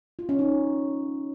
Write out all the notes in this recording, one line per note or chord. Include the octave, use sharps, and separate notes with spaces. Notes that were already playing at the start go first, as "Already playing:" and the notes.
F4
C#4
D#4